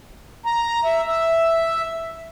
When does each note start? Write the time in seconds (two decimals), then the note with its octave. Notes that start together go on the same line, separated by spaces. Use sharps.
0.46 A#5
0.85 E5
1.08 E5